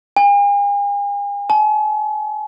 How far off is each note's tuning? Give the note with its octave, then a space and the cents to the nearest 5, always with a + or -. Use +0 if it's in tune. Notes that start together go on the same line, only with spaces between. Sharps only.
G#5 -45
G#5 +45